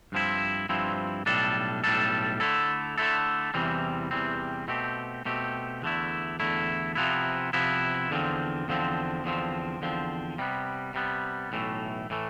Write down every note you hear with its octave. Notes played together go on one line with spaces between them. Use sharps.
G2 F3 C4 E4
G2 F3 C4 E4
B1 A2 G3 D4 A4
B1 A2 G3 D4 A4
D3 A3 E4 A4
D3 A3 E4 A4
E2 C3 E3 G3 C4
E2 C3 E3 G3 C4
B2 A3 C4 G4
B2 A3 C4 G4
E2 D3 A3 E4
E2 D3 A3 E4
C3 F3 B3 E4
C3 F3 B3 E4
E2 D3 F3 C4
E2 D3 F3 C4
E2 D3 F3 C4
E2 D3 F3 C4
C3 G3 B3
C3 G3 B3
B1 A2 E3 A3
A2 E3 A3